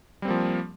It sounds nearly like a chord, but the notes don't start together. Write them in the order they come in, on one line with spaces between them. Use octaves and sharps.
G3 C4 A#3 F3